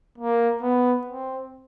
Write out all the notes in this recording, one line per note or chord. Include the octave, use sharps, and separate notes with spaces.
A#3
B3
C4